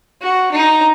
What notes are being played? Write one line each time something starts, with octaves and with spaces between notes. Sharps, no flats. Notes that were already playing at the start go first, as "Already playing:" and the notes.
F#4
D#4